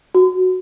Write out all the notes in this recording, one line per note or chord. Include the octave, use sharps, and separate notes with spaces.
F#4